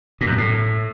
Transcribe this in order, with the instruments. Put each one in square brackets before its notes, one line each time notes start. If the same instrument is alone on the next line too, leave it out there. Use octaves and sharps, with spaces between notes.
[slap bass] A#2
F#2
G#2
A2